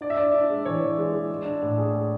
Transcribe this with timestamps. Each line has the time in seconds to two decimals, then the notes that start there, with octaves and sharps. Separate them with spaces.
0.01 D4 D5
0.10 E5
0.17 D4 D5
0.34 D4
0.49 G#3
0.65 E3 C#5
0.81 E3
0.98 G#3
1.13 G#3
1.30 G#3
1.46 D4
1.62 A2
1.78 G#4
1.94 G#4